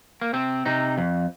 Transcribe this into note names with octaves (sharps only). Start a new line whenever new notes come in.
A#3
C3 C4
C3 D#4
F2